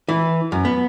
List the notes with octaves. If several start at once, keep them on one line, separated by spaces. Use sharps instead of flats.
E3
F#2
B3